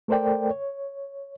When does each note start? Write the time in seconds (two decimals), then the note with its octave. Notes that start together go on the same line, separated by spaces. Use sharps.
0.08 A3 A4 A#4 C5 D5 G5
0.50 C#5